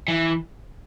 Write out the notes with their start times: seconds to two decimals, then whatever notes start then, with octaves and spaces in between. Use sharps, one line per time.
0.08 E3